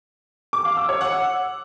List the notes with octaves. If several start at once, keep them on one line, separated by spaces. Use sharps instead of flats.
D6
F5
E6
C#5
F#5